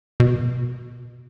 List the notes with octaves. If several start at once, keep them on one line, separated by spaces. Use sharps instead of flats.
B2